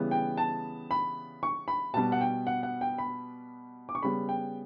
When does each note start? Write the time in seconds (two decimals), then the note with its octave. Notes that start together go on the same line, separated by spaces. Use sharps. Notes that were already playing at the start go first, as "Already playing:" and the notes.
Already playing: C#3 E3 G3 B3
0.11 G5
0.37 A5
0.91 B5
1.43 C#6
1.68 B5
1.94 B2 G3 B3 A5
2.12 F#5
2.21 G5
2.47 F#5
2.63 F#5
2.81 G5
2.98 B5
3.89 D6
3.95 C#6
4.03 C#3 G3 B3 B5
4.29 G5